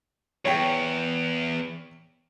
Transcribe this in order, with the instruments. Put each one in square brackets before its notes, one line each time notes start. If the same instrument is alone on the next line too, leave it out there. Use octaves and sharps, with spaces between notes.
[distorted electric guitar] E2 [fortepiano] C#5 G5